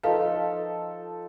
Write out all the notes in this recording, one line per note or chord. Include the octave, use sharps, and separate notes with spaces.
F3 D#4 A4 B4 F5